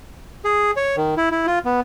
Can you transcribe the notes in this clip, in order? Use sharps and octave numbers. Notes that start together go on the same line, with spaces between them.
G#4
C#5
D#3
E4
E4
F4
B3